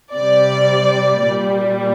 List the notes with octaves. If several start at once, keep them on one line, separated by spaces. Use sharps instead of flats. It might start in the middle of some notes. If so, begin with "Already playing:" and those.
C3 G3 D5
A#2 G3